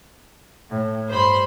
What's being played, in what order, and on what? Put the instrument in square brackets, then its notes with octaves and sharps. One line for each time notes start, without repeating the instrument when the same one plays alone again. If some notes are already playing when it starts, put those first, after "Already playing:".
[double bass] A2
[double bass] G2 [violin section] C5 B5 C6